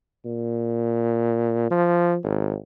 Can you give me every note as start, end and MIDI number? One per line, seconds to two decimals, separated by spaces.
0.25 1.70 46
1.70 2.17 53
2.23 2.55 32